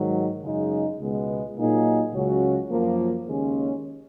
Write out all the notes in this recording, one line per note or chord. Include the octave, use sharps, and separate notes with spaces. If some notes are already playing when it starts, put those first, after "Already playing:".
Already playing: G#2 D#3 F#3
F#2 C#3 G#3 D#4
C#2 B2 G#3 B3
A#2 F#3 A#3 D#4 G#4
C#2 C#3 F#3 C#4 F#4
F#2 F3 A#3
D#2 C#3 G#3 C#4